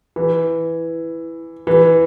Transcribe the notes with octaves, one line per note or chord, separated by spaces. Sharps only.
E3
E3